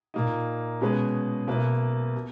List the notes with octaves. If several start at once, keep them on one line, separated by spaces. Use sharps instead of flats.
A#2 A#3 D#4
B2 G#3 C#4 G#4 B4
B1 B2 A#3 E4 B4
B2